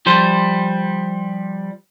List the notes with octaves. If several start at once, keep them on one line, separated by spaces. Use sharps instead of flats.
F3 G3 C5